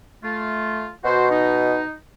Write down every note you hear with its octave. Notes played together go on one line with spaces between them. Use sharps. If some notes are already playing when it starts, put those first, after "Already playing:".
A3 F4
B2 F#4 C5
D#4